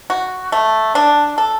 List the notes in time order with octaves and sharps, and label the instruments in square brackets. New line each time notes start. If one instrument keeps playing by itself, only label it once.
[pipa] F#4
A3
D4
A4